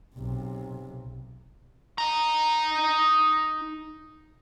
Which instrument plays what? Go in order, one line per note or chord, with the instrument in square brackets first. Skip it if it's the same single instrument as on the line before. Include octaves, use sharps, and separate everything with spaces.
[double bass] B1 C3
[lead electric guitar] D#4 A#5